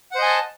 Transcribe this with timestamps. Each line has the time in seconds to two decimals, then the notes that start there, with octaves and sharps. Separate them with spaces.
0.11 F#5
0.15 C5
0.19 D#5
0.22 G#5
0.26 A5